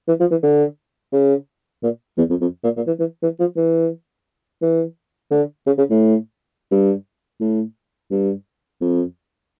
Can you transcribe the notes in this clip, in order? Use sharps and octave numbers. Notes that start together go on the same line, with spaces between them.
E3
F3
E3
D3
C#3
A#2
E2
F2
F2
A#2
A#2
E3
E3
E3
F3
E3
E3
D3
C#3
C#3
A2
G2
A2
G2
F2